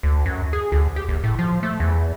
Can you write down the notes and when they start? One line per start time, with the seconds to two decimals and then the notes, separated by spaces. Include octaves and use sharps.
0.03 D2
0.26 F#2
0.53 G#4
0.72 D2
0.96 G4
1.09 F#1
1.24 A2
1.39 F3
1.63 A3
1.80 E2